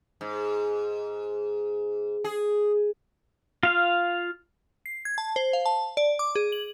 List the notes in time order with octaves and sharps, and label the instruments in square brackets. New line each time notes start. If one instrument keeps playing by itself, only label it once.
[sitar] G#2
G#4
[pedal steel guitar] F4 F5
[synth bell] C7
G#6
A5
C5
F5
A5
D5
D6
G#4
F#7